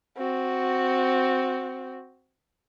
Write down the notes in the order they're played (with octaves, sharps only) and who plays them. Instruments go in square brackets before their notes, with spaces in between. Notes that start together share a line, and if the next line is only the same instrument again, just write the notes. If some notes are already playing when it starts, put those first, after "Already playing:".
[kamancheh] C4 F#4